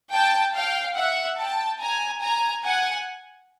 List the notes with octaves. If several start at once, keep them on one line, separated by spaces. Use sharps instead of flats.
G5 A5
F5 G5
E5 F#5
G5 A5
G#5 A#5
G#5 A#5
F#5 G#5